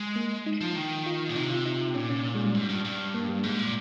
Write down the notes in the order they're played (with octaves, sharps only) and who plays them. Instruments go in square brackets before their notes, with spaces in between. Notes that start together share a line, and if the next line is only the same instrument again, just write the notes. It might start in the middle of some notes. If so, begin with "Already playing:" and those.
Already playing: [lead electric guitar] G#3
[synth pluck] A#3
D#4
[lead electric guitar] F3
D#3
[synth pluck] F4
[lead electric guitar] A#2
[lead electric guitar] C3 [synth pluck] D#4
[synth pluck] F4
D#4
[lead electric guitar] A#2 [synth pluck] C#4
[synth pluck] C#4
C#4
G#3
G3
[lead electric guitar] G#2
G2
G2
[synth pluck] A#3
G3
[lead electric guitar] G#2 [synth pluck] G#3
[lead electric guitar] A#2